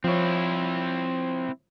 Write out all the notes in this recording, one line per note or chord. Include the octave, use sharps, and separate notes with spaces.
F3 C4 E4 C#5